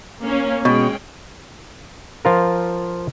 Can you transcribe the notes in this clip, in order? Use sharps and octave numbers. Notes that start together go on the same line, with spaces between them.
A#3 C#4
B2 G#3 C#4 G5
F3 F4 A#4